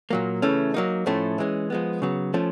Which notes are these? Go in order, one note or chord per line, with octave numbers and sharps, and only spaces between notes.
A#2 F#3 A#3
C#3 E3 A3 C#4
F#3 A#3 D#4
A2 F3 A3 C#4
E3 G#3 C#4
F3 G#3 B3
C#3 F#3 B3
F3 A3 C#4